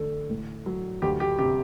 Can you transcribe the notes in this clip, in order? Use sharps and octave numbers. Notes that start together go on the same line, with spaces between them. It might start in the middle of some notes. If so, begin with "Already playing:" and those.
Already playing: D3 A3 A4
A2
F#3
D2 G4
G4
C3 G4